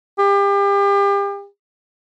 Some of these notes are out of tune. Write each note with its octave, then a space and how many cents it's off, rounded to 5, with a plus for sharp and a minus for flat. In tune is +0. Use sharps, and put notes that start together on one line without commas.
G4 +35